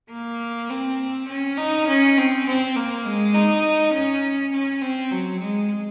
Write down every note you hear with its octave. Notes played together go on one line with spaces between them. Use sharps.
A#3
C4
C#4
D#4
C#4
C4
C4
A#3
G#3
D#4
C#4
C#4
C4
F#3
G#3